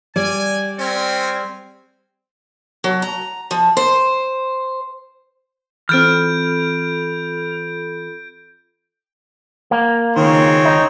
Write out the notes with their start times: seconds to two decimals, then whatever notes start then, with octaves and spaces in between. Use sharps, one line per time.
0.16 G3 D5 G#5
0.79 C4 C#4 A#4 G#5
2.84 F#3
3.02 A#5
3.51 F3
3.77 C5
5.89 E3 C4 F4 A4 B5 F6 G6 D7
9.71 A#3
10.16 C#2 D#3 G#3 C4 C#5
10.65 D#4